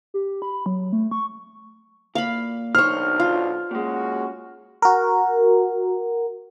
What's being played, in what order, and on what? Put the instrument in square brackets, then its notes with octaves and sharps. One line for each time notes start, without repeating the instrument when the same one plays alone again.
[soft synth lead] G4
B5
F#3
A3
C#6
[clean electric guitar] A#2 [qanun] F5 B5
[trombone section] B1 F#3 D4 [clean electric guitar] D#3 [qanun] C5 C#5 [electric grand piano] F6
[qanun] F4
[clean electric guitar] A#2 G#3 [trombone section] C#4 F#4
[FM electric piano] F#4 A#4